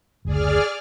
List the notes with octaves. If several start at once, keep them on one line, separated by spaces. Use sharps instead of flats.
F#1 D2 G#4 D5 F6